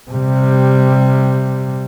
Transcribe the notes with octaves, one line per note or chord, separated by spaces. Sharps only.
C3 G3